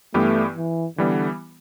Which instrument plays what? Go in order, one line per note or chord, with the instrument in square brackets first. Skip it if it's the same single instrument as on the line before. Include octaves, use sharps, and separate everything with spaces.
[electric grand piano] G2 E3 B3 G4 [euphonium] A3
[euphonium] E3
[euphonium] D3 [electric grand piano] E3 G3 B3